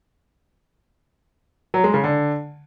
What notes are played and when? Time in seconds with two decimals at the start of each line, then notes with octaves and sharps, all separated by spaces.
1.74 F#3
1.84 G#3
1.94 C#3
2.04 D3